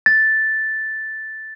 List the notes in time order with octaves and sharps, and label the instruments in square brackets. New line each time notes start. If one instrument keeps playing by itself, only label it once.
[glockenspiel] A6